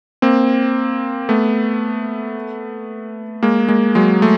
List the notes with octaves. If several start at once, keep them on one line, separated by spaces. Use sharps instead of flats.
A#3 C4
A3 B3
G#3 A#3
G#3 A#3
F#3 G#3
A3